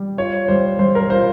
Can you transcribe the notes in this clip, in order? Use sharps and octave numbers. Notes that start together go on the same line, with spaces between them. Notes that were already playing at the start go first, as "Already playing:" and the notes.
Already playing: G3
F4 C#5
G3 C5
G3 C5
A#4
F4 C5